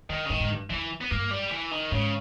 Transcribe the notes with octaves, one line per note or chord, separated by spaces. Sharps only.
G2 D#3
C#3
G2 D#3
G#2
G2
E2 E3
B3
G2 A#3
G3
E3
D#3
G#2 C#3